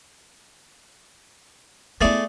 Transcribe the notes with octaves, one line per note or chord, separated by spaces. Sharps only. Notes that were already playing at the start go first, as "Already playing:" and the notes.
A3 B3 E4 G#4 D5